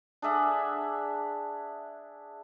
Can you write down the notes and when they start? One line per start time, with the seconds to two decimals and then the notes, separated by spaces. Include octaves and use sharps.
0.22 D4 G#4 E5 F#5